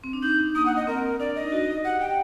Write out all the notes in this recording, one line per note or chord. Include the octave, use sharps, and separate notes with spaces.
C4
D4
D#4 G6
D4
A#3 D#6
F#5
D#5
C4 A#4
D4 D5
D4
D#5
D#4
F#4
G4 F#5
G4 G5